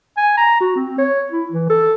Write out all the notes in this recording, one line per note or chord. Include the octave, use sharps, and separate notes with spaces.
G#5
A#5
F#4
C4
C#5
E4
E3
A4